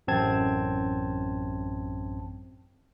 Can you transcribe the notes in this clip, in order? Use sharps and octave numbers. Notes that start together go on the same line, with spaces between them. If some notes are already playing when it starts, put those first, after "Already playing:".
A1 F#2 C4 A5 G#6